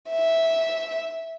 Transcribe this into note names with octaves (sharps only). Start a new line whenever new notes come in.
E5